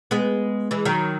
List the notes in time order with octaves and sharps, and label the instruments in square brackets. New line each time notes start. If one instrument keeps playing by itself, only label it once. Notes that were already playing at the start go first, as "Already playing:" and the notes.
[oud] G#3 B3
E3 G#3
D#3 F#3